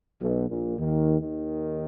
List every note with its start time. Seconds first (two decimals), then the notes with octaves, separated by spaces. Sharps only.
0.22 B1 B2
0.50 A#1 A#2
0.78 D#2 D#3
1.21 D#2 D#3